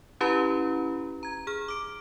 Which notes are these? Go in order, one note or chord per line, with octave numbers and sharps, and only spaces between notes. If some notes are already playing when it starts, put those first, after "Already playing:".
C#4 E4 G4 B4 A#5 B5
A#5 G#6
G#4 F6
D6 D7